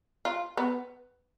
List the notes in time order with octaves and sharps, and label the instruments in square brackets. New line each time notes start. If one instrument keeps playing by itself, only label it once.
[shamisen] F4
B3